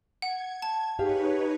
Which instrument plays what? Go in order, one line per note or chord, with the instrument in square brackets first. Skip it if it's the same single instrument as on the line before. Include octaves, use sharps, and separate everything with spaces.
[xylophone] F#5 [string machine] G#6
[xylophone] A5
[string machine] D#4 B4 C#5 [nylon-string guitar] G4 G#4 F5